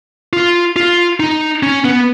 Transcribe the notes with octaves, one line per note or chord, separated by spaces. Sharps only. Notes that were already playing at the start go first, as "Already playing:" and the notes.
F4
F4
D#4
C#4
B3